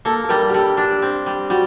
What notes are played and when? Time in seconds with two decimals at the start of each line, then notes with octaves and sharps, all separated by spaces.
0.05 A#3 A4
0.24 A4
0.29 G3 A#4
0.49 G4
0.54 G3 A4
0.77 D4 G4
1.02 C4
1.26 G3
1.50 G3 F#4